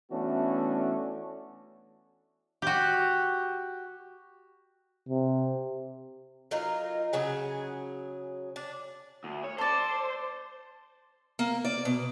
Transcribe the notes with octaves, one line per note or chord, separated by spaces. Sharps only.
E3 A3 B3 C#4 D4 F#4
F#4 G4
C3
F#3 D#4 F4 A#4
C#3 F#3 G#4
D4
D2
C#5
A4 C5 D5
A#3
D5
B2